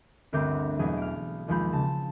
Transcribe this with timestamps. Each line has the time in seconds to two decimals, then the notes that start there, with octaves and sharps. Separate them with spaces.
0.33 G1 D2 C4 A#4 D6 G6
0.79 B1 E2 F#3 G#4 D#5
0.97 F6 D7
1.48 D#2 F3 G#3 F4 B5 G6
1.73 C#3 A5